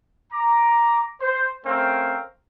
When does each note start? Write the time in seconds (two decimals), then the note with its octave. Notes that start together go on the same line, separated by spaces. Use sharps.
0.33 A#5 D6
1.21 C5
1.66 A3 C4 C#4 A#4 F5